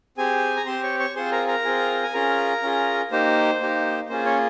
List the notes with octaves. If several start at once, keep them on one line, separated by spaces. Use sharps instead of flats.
C4 G4 G#4 G#5
A#5
C4 G4 C5 C6
C#5 C#6
C#5 C#6
C4 F4 G#4 C5 C6
A#4 A#5
A#4 A#5
C4 F4 G#4
G#5
C#4 F4 G#4 A#4 A#5
C#4 F4 G#4
A#3 D#4 G4 C5
A#3 D#4 G4
A#3 C#4 F4 G#4 C5
C#4 C#5